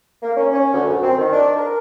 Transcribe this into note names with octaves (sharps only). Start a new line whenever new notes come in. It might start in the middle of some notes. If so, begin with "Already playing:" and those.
A#3
C#4
C#4
D2
F#2
C4
D#3
D4
A#4